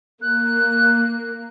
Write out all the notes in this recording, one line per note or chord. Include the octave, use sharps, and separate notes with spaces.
A#3 F#6